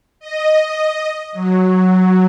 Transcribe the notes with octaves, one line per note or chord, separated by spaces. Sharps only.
D#5
F#3